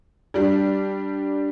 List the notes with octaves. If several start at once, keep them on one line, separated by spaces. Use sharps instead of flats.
G3 D4